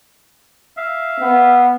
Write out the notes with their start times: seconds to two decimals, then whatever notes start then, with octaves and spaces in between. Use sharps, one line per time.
0.77 E5 F5
1.19 B3